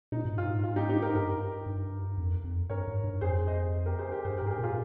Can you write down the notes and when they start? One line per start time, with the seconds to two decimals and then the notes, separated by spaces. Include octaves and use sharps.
0.12 A#2 D#4
0.25 G#2
0.38 G2 F4
0.50 G#2
0.64 F4
0.76 D#4 G4
0.89 D#4 G4
1.02 G4 A#4
1.15 G2 G4 A#4
1.66 G2
2.18 F2
2.44 F2
2.70 G2 A#4 C#5
2.88 G#2
3.04 G2
3.21 F2 G#4 C5
3.47 C5 D#5
3.86 G4 A#4
3.99 G#4 C5
4.11 G4 A#4
4.25 G2 G#4 C5
4.38 G4 A#4
4.42 G#2 G#4
4.50 G4 A#4
4.59 A#2 F4 G#4